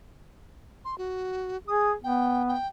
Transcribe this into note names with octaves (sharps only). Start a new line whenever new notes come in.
C6
F#4
G#4 D#6
B3 G5
G5